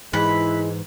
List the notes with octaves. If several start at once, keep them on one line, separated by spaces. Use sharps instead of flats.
G#2 E3 G#3 E4 B4 B5